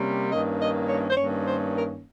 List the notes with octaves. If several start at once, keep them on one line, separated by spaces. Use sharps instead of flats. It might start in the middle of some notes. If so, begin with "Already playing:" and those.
Already playing: C3 G3 A#3 C#4
G2 D#3 A#3 C#4 D#5
D#5
C#5
C5
G2 D#3 A#3 C#4 C#5
C5
A#4